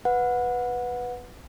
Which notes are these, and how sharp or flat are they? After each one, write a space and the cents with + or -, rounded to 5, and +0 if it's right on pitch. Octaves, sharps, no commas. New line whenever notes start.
B4 +0 F#5 -20